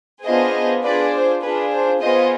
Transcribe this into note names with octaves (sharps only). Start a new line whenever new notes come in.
B3 D4 F4 G#4 C5 D#5
D4 F4 G#4 B4 D5
C5
D4 F4 G#4 B4
C5
B3 F4 G#4 C5 D#5